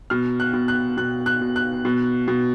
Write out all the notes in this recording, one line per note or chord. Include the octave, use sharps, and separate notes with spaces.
B2 F6
F#6
B2
F#6
B2 F#6
F#6
B2
F#6
B2
B2